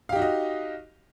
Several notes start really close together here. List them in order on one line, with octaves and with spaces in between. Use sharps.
F5 G4 D#4 F#4 D#5